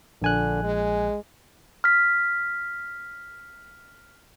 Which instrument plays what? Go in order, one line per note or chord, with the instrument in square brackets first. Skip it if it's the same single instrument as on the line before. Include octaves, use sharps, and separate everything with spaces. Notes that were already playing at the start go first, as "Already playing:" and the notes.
[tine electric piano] A#1 G#5 F#6 [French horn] D3
[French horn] G#3
[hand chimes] F6 B6